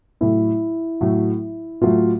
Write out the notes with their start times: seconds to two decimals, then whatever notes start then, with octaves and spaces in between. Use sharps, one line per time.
0.21 A2 F#3 A3 E4
1.01 A2 F#3 A3
1.81 A2 F#3 A3 F4